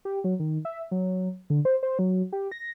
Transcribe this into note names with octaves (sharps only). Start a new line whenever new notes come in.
G4
F#3
D#3
E5
F#3
D3
C5
C5
F#3
G4
A#6